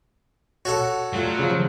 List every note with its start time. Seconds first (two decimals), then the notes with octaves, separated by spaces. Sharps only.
0.65 F#4 A4 C#5 F#5
1.13 F#3 G3 A3 F4
1.39 C#3 F3